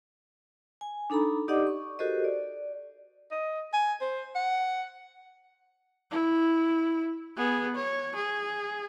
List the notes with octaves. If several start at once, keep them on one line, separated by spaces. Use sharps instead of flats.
G#5
D4 D#4 A4 A#5 B5
D#4 G4 D5 D#5 F#5 D6
C#6
F#4 G4 A4 A#4 C5 D#5
D5
D#5
G#5
C5
F#5
E4
B3 G#4
C#5
G#4